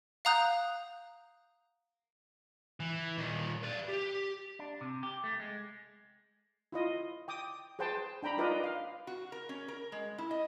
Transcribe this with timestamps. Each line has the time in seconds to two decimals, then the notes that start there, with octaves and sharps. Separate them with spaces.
0.25 F5 F#5 A#5 D#6 F#6 G6
2.80 E3
3.18 A#2 D#3
3.63 B4 D5
3.89 G4
4.59 D4
4.81 C3
5.03 G4
5.24 A3
5.40 G#3
6.72 E4 F4 D#5
7.28 G5 D6 D#6
7.79 G#4 B4 C5 G5 A5
8.23 D4 G5 A#5 B5
8.37 D#4 F4 A#4 B4 D5 D#5
8.64 F5
9.07 F#4
9.32 A#4
9.49 C#4
9.68 A#4
9.92 G#3
10.18 E4
10.31 D#5